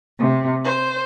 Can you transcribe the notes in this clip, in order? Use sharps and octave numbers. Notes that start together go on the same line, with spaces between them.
C3
C5